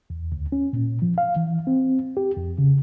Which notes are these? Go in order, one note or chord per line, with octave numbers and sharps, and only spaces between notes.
E2
D2
C#4
A#2
F3
F5
E3
C4
G4
F2
C#3